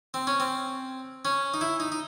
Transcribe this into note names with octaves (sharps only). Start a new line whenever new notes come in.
C4
C#4
C4
C#4
D#4
E4
D#4
D#4